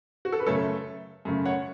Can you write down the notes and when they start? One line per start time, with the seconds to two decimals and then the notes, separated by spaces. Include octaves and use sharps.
0.25 F#4
0.32 A4
0.40 B4
0.46 F#2 C#3 A3 A4 C#5
1.25 F#2 C#3 A3
1.45 C#5 F#5